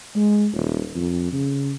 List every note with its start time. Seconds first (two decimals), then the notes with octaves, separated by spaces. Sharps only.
0.16 G#3
0.54 D#1
0.95 F2
1.32 C#3